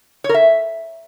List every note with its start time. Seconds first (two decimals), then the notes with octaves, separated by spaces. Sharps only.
0.24 C#5
0.29 A#4
0.34 E5